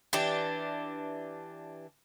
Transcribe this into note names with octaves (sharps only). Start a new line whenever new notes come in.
E3 D4 G4